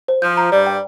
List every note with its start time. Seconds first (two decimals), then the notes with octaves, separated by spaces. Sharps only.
0.08 C5
0.22 F3 G6
0.37 A#5
0.52 G2 G3 D5
0.67 G5